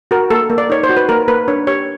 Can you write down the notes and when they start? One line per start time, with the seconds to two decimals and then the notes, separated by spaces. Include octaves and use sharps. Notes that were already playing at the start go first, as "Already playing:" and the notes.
0.11 F#4 A#4
0.31 A#3 A4
0.50 A#3
0.58 D5
0.70 D#4 C#5
0.84 C5
0.89 F#4
0.97 B4
1.09 A#3 A#4
1.28 A#3 B4
1.48 D4 C#5
1.67 G4 C#5